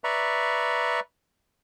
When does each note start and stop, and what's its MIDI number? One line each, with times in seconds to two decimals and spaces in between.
0.04 1.00 71
0.04 1.00 74
0.04 1.00 76
0.04 1.00 82
0.04 1.00 83
0.04 1.00 85